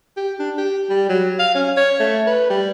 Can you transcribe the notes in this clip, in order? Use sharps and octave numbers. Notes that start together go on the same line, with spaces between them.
G4
D4
G4
G3
F#3
F5
C#4
C#5
A3
B4
G3